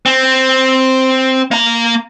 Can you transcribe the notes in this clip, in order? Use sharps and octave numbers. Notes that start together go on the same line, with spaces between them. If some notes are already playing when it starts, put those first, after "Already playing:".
C4
A#3 A#5